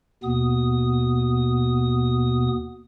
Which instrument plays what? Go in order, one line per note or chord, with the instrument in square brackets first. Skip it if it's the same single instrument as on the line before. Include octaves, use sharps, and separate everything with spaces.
[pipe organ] D#2 B2 B3 D#6